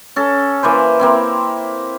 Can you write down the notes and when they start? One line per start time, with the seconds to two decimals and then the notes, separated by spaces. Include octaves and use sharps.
0.16 C#4 A4
0.63 E3 A#3 B4 C5
0.99 A#3 C4 E4